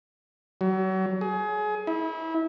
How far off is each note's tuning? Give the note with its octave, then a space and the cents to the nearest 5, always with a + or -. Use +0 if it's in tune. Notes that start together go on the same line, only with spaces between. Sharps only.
F#3 +35
G#4 +25
E4 -25